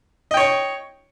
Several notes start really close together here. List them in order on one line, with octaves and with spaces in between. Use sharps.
D#5 G5 C#5 C#6